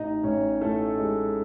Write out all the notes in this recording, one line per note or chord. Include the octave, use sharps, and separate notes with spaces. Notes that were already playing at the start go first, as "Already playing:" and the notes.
Already playing: A1 D#4 D#5
A1 C#4 C#5
A2 A3 A4
G#3